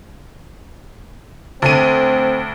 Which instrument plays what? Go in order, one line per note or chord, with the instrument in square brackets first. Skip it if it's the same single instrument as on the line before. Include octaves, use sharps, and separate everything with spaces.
[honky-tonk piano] D2 D#7 [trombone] C4